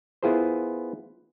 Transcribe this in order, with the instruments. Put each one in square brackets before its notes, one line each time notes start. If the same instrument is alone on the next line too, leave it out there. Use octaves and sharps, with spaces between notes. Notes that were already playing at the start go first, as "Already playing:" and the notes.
[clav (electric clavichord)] B3 E4 F4 G#4 A#4 C5